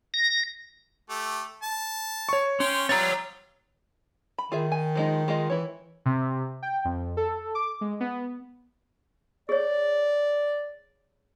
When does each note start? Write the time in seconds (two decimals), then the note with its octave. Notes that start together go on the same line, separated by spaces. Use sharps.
0.14 A#6
1.10 A3 G4
1.63 A5
2.29 C#5 C#6
2.60 C#4 G5 C6
2.89 G3 B3 F4 C#5 A#5 A6
4.38 B5
4.52 D#3 F4 G#4 E5
4.72 G#5
4.95 F3 G#3 D#4
5.28 G#3 F4 D#5
5.50 E3 E4 C#5
6.06 C3
6.62 G5
6.85 F2
7.17 A4
7.55 D6
7.81 G#3
8.00 B3
9.49 G#4 C#5 D5